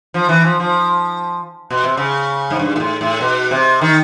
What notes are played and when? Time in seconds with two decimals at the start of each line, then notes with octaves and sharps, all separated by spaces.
0.14 F3
0.29 E3
0.45 F3
0.60 F3
1.70 B2
1.84 C3
1.97 C#3
2.50 G#2
2.59 G2
2.76 A#2
2.80 A2
3.01 A2
3.21 B2
3.51 C3
3.82 D#3